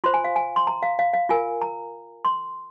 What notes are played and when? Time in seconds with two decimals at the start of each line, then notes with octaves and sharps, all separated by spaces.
0.04 F4 C5 C6
0.14 G#5
0.24 F5
0.36 G#5
0.56 C6
0.67 A#5
0.83 F5
0.99 F5
1.13 F5
1.29 F4 A#4 G#5
1.62 A#5
2.25 C6